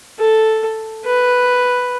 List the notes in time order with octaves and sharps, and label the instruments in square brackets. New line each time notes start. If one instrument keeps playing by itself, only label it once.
[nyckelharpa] A4
B4